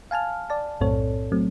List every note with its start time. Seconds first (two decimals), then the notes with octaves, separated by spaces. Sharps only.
0.11 F5 G#5 A5 F6
0.50 D5 A5
0.81 B1 F#2 A2 C4 A4 C#5
1.32 F#3 A3 C4